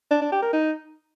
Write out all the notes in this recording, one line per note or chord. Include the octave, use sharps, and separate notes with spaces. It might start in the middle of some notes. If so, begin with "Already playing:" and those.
D4
D4
G4
A#4
D#4